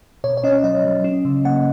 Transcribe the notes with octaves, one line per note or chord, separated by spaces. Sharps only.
B2 C#5
C#5
C#4 D#5
F#3 D#5
F#3
C#4
C#3
A#3 F#5